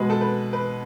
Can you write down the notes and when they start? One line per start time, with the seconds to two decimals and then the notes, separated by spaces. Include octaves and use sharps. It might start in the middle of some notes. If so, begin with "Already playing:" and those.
Already playing: B2 G#3 B4
0.10 A4
0.21 B4
0.53 B4